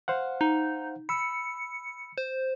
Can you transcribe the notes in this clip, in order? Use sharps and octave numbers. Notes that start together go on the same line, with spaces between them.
C5 F5 F#5
D#4
B5 E6 C#7
C5